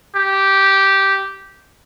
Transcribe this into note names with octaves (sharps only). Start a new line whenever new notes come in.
G4